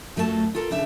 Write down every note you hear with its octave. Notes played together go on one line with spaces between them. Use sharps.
F#2 F#3 A3 F4 B4 A5
F4 A4 A#4
D#2 C#3 D4 E5